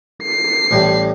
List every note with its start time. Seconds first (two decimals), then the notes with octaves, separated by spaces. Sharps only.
0.23 C7
0.71 A1 A2 G3